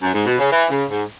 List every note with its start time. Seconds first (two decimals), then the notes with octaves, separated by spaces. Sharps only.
0.02 F#2
0.14 G#2
0.26 B2
0.38 C#3
0.51 E3
0.70 C#3
0.89 G#2